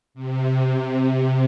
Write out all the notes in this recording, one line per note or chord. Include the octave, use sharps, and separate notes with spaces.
C3